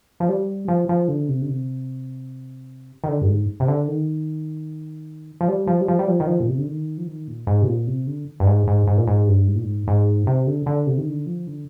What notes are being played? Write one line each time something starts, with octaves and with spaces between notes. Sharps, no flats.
F3
G3
F3
F3
D3
C3
D3
C3
D#3
D3
G2
G#2
C3
D3
D#3
F3
G3
F3
G3
F3
G3
F3
D#3
F3
A#2
C3
D3
D#3
F3
D#3
A#2
G#2
C3
A#2
C3
D3
G2
G#2
G#2
G#2
A#2
G#2
G2
G#2
A#2
G#2
G#2
C3
D3
D3
C3
D#3
D3
F3
D3